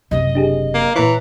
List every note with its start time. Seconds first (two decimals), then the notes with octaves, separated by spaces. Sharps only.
0.11 F#1 C3 D#5
0.35 D4 G4 G#4
0.74 A#3
0.96 A#2 E3 C#5 A#5